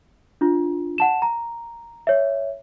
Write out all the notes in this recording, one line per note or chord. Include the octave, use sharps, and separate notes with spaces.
D4 F4
F#5 A5 E7
A#5
C#5 E5